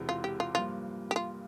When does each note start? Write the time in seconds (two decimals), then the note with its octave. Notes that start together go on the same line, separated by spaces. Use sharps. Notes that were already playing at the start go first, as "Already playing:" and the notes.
Already playing: E1 E2 C3 E3 G#3
0.09 F4
0.24 G4
0.40 F4
0.55 G2 F3 A#3 F4
1.11 G4
1.16 F4